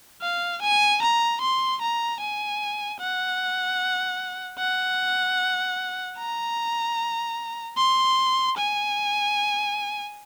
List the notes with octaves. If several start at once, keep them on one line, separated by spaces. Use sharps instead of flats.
F5
G#5
A#5
C6
A#5
G#5
F#5
F#5
A#5
C6
G#5